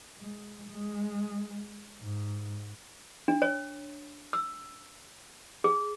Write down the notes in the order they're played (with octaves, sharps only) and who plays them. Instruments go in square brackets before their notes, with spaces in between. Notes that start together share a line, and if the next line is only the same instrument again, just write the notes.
[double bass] G#3
G#3
G#2
[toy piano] D4
C#5
E6
G#4